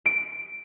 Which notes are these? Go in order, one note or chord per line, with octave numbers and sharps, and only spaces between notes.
D7